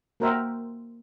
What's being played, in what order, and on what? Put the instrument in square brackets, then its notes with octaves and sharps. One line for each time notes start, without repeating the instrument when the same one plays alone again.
[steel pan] A#3 F#4 A#4 C5 E5 G5